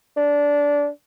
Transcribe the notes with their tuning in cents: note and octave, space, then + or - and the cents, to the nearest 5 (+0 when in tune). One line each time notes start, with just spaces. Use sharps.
D4 -15